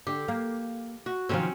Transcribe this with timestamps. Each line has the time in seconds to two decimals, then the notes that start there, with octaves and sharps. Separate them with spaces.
0.07 D3 G4
0.28 A#3
1.06 F#4
1.29 C3 D#3 F3 C4 C#4 C#5